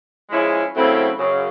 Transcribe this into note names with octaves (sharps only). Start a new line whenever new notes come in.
F3 G#3 C#4 E4 G#4
C#3 F#3 A3 C4 E4
F#2 C#3